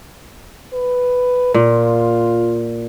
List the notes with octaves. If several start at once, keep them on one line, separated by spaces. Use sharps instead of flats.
B4
A#2 F4